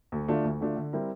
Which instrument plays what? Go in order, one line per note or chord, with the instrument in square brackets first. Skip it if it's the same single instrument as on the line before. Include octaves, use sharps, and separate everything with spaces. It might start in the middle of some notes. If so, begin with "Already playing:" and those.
[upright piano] D2
D3 A3 D4 F4
D2
D3 A3 D4 F4
D3
G3 C4 E4 A#4